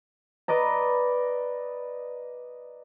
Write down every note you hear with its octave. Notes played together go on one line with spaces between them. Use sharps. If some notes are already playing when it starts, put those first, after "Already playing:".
B4 D5 D#5 A#5